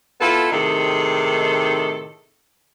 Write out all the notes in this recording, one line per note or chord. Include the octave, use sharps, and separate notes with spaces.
B3 E4 F4 A4
A2 C3 D#3 D#4 G#4 A4